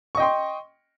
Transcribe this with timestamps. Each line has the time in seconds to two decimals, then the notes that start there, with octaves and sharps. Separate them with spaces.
0.15 C#6
0.17 D#5
0.20 G5
0.22 C6